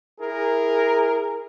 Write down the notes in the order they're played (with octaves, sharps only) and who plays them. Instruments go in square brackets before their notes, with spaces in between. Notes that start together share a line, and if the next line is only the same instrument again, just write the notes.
[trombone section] E4 G#4 A#4